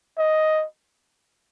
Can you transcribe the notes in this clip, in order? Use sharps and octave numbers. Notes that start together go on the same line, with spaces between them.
D#5